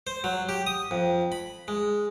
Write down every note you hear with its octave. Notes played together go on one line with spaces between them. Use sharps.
C5
F#3
G4
D#6
F2
B5
G#3